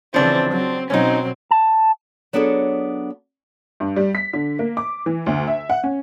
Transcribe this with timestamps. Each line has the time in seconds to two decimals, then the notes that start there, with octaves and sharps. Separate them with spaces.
0.14 C#3 E3 F3 C4 D4
0.51 F#3 C4
0.90 B2 F#3 C4 C#4 D#4
1.51 A5
2.33 F#3 B3 D4 G#4 A4 C#5
3.80 G2
3.96 G3
4.15 B6
4.33 D3
4.59 A#3
4.77 D6
5.06 E3
5.26 D2
5.47 E5
5.70 F#5
5.84 C#4